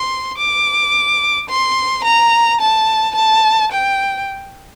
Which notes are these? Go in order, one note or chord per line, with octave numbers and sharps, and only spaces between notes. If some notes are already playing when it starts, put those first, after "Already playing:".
Already playing: C6
D6
C6
A#5
A5
A5
G5